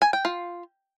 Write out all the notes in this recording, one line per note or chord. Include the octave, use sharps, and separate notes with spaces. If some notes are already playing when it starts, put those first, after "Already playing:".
G#5
G5
F4